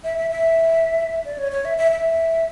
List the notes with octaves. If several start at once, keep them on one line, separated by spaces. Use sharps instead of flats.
E5
E5
E5
D5
C#5
C#5
E5
E5
E5